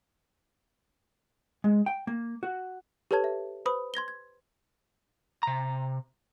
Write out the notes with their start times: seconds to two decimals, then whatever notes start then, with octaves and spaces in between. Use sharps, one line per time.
1.64 G#3
1.86 G5
2.07 A#3
2.43 F#4
3.11 G4 A4 B4 C#5 A5 G#6
3.24 E5
3.66 B4 C5 B5 D#6
3.94 C6 G#6 A#6 G7
4.08 G#6
5.43 C3 A#5